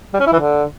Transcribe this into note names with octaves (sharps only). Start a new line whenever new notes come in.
G3
C#4
E4
E3
D3